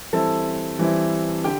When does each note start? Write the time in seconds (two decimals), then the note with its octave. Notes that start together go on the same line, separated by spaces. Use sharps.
0.13 E3 G3 C4 E4 A4 A5
0.79 E3 G3 C4 E4
1.44 D3 G4 G5